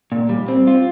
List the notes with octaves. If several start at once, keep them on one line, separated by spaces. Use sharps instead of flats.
A#2
G3
C4
F4